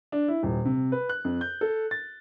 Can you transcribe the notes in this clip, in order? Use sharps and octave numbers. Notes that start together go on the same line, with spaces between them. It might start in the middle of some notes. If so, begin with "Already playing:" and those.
D4
E4
D#1
C3
B4
F#6
F2
G6
A4
A6